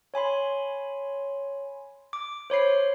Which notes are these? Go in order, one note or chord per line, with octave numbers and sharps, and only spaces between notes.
C#5 G#5 B5 C6
D6
C5 C#5 B5 C7